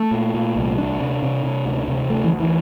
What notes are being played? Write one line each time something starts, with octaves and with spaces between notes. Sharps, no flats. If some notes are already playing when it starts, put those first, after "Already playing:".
Already playing: A3
A#2
A#2
C2
D2 D4
C3
C3
C3
D2
C3
D2 A3
E3
D2
E3